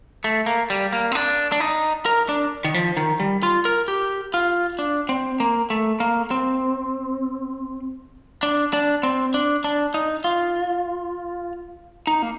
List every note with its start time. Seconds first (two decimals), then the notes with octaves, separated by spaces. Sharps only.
0.24 A3
0.46 A#3
0.70 G3
0.93 A#3
1.12 C4
1.15 D4
1.52 D4
1.60 D#4
2.06 A#4
2.29 D4
2.65 D#3
2.74 F3
2.97 D#3
3.20 G3
3.43 F4
3.65 A#4
3.88 G4
4.34 F4
4.79 D4
5.09 C4
5.40 A#3
5.70 A3
6.00 A#3
6.31 C4
8.43 D4
8.73 D4
9.03 C4
9.34 D4
9.64 D4
9.94 D#4
10.24 F4
12.07 D#4
12.22 A#3